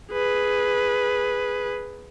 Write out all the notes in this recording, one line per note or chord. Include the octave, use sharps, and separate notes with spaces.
G#4 B4